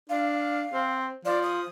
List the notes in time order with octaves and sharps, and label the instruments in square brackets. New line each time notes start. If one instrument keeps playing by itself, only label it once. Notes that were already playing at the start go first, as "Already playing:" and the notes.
[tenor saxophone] D4 [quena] F5
[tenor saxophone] C4
[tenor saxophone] F3 [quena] D5
[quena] D#6